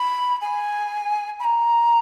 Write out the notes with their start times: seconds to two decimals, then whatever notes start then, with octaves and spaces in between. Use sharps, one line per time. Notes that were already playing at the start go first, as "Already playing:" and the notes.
Already playing: B5
0.41 G#5
1.40 B5
1.44 A#5